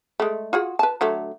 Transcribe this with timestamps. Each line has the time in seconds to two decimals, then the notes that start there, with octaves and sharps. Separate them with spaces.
0.20 G#3 A3
0.53 F4 F#4 G#4
0.79 B4 A5
1.01 D3 F#3 A3